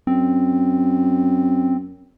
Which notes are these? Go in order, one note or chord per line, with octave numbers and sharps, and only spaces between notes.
F#2 C4